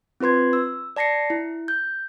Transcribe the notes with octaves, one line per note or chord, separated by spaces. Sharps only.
C4 F4 B4 C6 G#6
E6
D5 A5 A#6 C7 C#7
E4
G6